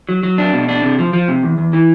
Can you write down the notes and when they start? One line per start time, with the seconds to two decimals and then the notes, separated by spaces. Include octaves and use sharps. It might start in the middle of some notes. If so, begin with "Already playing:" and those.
0.09 F#3
0.23 F#3
0.38 D4
0.54 B2
0.69 D4
0.83 C3
0.99 F3
1.13 F3
1.28 C3
1.43 E2
1.58 E2
1.73 E3